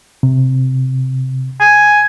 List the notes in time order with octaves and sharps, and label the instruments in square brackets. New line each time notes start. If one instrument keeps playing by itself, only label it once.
[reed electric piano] C3
[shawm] G#5